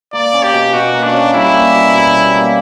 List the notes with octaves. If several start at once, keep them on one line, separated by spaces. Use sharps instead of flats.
A#3 D5
C#4
G4
B2
B2 F#4
A#3
D4
C#4
G3 E4
A#3
B2
B2
G3
A#3